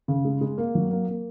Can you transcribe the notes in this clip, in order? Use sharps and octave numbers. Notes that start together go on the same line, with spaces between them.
C#3
G#3
G#3
A#3
F#3
A#3
A#3